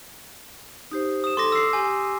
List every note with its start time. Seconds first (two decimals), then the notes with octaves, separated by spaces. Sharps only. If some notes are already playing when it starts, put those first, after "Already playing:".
0.91 D#4 G4 C5
1.24 D#6 E7
1.37 A4 C6 D6 A#6
1.52 E6 C7
1.73 G4 G#5